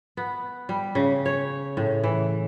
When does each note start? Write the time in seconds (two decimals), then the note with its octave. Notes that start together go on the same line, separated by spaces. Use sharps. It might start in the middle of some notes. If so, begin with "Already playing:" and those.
0.17 B3
0.69 G3
0.95 C#3
1.26 C#5
1.77 A2
2.04 E3